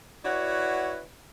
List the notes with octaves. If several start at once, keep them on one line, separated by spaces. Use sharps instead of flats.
E4 F#4 B4 C#5 D5 F#5